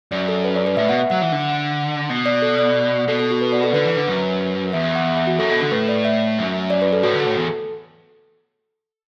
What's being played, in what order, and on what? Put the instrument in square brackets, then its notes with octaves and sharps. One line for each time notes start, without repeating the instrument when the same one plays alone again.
[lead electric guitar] F#2 [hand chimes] D5
[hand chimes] A4
B4
D5
B4
[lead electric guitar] A2 [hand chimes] E5
[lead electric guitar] B2 [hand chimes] F#5
[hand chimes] E5
[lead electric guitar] F#3 [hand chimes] F#5
[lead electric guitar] E3
D3
B2
[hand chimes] D5
A4
D5
[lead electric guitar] B2 [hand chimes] A4
[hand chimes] A4
F#4
B4
D5
A4
[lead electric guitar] D3 [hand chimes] B4
[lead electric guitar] E3
D3
F#2
[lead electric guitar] E2 [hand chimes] E5
[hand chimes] E5
F#5
E5
E5
F#4
[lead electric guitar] F#2 [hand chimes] A4
[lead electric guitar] B2 [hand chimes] A4
[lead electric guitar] D3 [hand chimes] A4
[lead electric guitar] A2 [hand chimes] B4
[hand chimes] D5
E5
[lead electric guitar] F#2
[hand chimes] D5
B4
A4
[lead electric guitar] A2 [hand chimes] F#4
[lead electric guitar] D3
[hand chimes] A4
[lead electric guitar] A2
E2